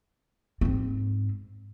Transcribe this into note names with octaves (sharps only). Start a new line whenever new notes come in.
G#2 C4